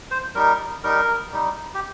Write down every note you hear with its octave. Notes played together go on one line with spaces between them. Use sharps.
C5
G3 D#4 A#4
G3 D#4 A#4
G3 D#4
G4